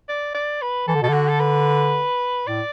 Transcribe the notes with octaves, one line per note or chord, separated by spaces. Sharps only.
D5
D5
B4
E3 A4
D3
B2 A4
D3 F#4
A4
B4
A2 D5